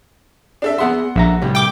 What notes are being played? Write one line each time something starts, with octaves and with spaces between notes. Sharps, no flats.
D4 A4 E5
B3 G#4 E5 F#5 C6
A#1 D3 E5 A#5
A2 C3 G3
G5 D6